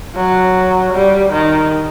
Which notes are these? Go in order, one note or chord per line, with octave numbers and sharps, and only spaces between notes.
F#3
G3
D#3